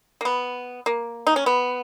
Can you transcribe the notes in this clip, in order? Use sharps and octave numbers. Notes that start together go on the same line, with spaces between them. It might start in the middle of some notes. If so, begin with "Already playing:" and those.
A#3
B3
A#3
D#4
C#4
B3